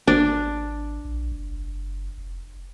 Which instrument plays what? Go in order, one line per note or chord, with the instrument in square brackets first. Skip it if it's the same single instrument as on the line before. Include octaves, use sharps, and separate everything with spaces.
[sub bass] G#1 [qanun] D4
[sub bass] A#1
F#1
F1